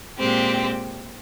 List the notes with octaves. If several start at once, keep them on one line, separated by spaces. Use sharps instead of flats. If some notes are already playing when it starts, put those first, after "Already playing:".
A#2 G#3 C4 G4